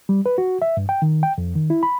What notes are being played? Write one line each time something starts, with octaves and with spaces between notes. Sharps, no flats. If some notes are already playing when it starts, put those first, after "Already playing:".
G3
B4
F#4
E5
G2
G5
D#3
G5
F2
D#3
E4
B5